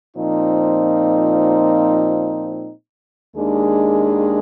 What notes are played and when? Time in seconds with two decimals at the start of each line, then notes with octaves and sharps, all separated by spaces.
0.15 A#2 F3 C4 D#4
3.34 D#2 D#3 G#3 D4 G#4